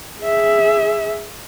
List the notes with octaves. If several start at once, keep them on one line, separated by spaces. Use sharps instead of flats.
G#4 E5